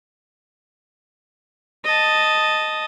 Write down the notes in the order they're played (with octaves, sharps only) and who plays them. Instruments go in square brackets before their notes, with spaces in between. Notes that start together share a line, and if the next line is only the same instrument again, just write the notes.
[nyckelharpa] D#5 A5